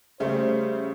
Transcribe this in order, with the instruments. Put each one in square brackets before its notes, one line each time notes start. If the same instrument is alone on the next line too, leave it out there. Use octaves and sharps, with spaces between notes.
[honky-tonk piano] C#3 G3 A3 [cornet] C5